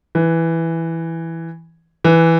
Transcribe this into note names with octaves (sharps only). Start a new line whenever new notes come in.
E3
E3